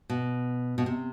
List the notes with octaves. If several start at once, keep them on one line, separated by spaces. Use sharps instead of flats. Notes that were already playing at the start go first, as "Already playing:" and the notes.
B2
B2
C3